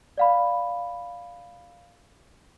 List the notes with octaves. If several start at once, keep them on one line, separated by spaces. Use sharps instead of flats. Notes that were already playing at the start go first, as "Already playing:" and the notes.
D5 F5 B5